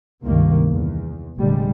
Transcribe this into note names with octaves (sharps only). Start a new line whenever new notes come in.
C#2 G2 C3 D#3 A#3
E2
F1 A#2 D3 G3 G#3